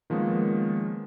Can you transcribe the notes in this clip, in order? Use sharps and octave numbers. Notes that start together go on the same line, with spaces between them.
D#3 F3 G#3 A#3 B3 C#4